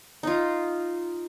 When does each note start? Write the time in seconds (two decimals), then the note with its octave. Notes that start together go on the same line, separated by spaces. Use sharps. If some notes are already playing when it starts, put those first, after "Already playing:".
0.23 D#4 F4